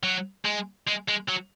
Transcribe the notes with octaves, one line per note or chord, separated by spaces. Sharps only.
F#3
G#3
G#3
G#3
F#3